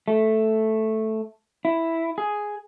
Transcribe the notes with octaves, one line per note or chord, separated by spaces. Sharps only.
A3
E4
G#4